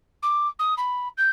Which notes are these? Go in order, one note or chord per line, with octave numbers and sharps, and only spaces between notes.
D6
D#6
B5
G6